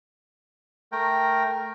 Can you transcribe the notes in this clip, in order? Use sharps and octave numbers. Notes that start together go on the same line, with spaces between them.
A3 A#4 G5